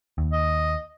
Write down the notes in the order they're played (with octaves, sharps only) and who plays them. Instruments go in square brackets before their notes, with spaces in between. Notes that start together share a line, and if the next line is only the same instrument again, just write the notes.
[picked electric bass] D#2
[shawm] D#5